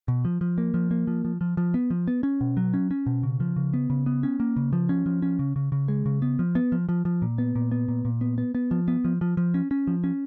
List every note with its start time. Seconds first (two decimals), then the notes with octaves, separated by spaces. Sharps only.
0.08 B2
0.25 F3
0.41 F3
0.58 A#3
0.74 F3
0.91 A#3
1.07 F3
1.25 F3
1.41 F3
1.57 F3
1.74 B3
1.90 F3
2.08 B3
2.23 C#4
2.41 B2
2.57 F#3
2.74 C#4
2.91 C#4
3.06 B2
3.23 C#3
3.40 F3
3.56 C#3
3.74 B3
3.90 C#3
4.06 B3
4.23 C#4
4.40 A#3
4.56 C#3
4.73 F3
4.89 C#4
5.06 F3
5.22 C#4
5.39 C#3
5.56 C#3
5.72 C#3
5.88 G#3
6.06 C#3
6.22 B3
6.39 F3
6.55 B3
6.72 F3
6.89 F3
7.05 F3
7.22 A#2
7.38 B3
7.55 A#2
7.71 B3
7.88 A#2
8.05 A#2
8.21 B3
8.38 B3
8.55 B3
8.71 F3
8.88 B3
9.05 F3
9.21 F3
9.37 F3
9.54 C#4
9.71 C#4
9.87 F3
10.04 C#4